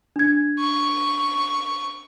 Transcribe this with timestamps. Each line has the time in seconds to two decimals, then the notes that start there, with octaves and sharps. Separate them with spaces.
0.16 D4 G#6
0.60 C#6